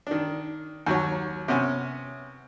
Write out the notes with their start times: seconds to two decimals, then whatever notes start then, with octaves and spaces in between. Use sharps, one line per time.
0.07 D#3 D4
0.86 D#2 F#3 C#5
1.48 C3 B3 C#4